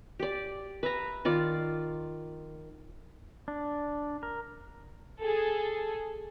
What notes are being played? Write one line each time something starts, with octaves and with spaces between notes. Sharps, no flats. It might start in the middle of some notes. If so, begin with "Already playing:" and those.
G4 D5
B4 E5 A#5
D#3 F4 D5 D6
D4
A#4
G#4 A4